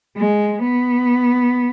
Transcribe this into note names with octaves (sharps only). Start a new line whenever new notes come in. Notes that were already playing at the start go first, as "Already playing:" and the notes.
G#3
B3